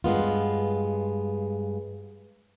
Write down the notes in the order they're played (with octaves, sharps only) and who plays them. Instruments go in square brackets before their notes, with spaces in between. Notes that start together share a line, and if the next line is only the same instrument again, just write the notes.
[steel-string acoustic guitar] G2 G#3 B3 F4